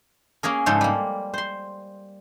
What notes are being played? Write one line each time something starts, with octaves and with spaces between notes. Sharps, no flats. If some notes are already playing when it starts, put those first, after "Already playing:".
A#3 C#4 G#4 A#4
G#2 C#3 F3 A4 C5 C#5
G3 A#3
C5 C6